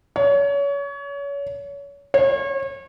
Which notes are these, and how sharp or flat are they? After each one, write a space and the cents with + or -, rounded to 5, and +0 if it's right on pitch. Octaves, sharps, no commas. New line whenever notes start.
C#5 +30
C#5 -35